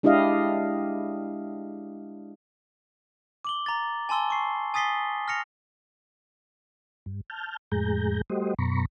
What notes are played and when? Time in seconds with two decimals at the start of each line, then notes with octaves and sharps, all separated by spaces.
0.03 G#3 D4 E4 G4 D#5 F5
3.45 D6 F#7 G7
3.66 A#5 A6
4.09 G#5 A5 C6 E6 G7
4.30 C#6 C7
4.74 G#5 D#6 A6 B6 C7 G7
5.28 F6 A#6 C#7 F7
7.06 G2
7.30 A5 F6 G6
7.72 F2 A2 G#3 G#4 A#5 G6
8.30 G3 A3 F#4 G4 C5 D#5
8.59 F#2 B2 A#5 B5 C#6